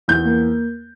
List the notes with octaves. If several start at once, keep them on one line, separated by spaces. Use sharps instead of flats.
E2 G6
A#3